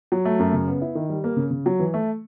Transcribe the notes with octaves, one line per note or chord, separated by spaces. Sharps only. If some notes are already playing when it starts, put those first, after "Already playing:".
F#3
A3
F#2
C#3
B3
E4
D#3
G3
A#3
C#3
C#3
F#3
E3
A3